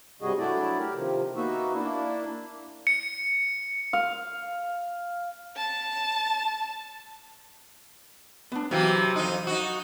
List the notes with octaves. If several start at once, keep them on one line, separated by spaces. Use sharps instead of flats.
G2 C3 G3 F#4 G#4 D#5
F#3 A3 D4 E4 D5
G4 A#4
C3 D#3 F3
A#3 B3 D#4 F#4 E5
A#3 D4 E4
C#7
F5
A5
B3 D4
C3 E3 F#3 E4 F5 G5
F2 D#4
D#4 F#4